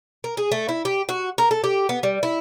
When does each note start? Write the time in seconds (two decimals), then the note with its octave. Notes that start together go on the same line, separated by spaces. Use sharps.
0.24 A#4
0.37 G#4
0.52 A3
0.69 E4
0.85 G4
1.09 F#4
1.38 A#4
1.51 A4
1.64 G4
1.89 B3
2.03 G3
2.23 E4